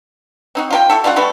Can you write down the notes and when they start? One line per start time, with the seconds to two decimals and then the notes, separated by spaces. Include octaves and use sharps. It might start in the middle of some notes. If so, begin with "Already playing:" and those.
0.55 C4 D#4 F#4
0.71 F4 A#4 G5
0.90 E4 F#4 A4
1.04 G3 C#4 F4 F#5
1.16 G3 A3 B3 F#4